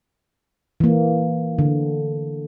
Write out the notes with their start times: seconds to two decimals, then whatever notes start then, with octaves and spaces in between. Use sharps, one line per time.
0.80 E3 A#3
1.59 D3